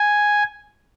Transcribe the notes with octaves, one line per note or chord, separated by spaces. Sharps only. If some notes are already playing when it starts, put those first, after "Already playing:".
Already playing: G#5